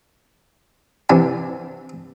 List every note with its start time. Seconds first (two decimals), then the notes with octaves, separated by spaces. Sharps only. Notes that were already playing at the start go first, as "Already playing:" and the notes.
1.09 C3 E3 D4 G#5 B5